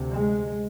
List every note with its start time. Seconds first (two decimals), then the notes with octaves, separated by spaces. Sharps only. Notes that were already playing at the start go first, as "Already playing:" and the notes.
Already playing: D2 C3
0.12 G#3